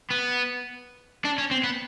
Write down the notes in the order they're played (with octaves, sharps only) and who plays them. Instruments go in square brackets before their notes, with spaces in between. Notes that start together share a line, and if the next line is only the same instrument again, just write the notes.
[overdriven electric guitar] B3
D4
C#4
C4
B3